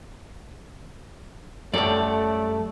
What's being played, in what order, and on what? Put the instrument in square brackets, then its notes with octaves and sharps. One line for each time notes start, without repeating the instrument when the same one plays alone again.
[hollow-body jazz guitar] F#2 G3 [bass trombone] A3 [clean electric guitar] A4 C#5 D5